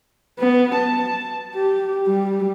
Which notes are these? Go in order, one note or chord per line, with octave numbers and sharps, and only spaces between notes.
B3
A5
G4
G3